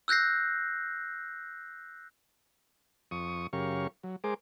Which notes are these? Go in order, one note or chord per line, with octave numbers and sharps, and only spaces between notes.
E6 F#6 G6 A#6 C7
F2 C#6 D#6
F#2 C#3 G4 A#4 F5 C#6
F#3
G#3 G#4 A#4 C5 D6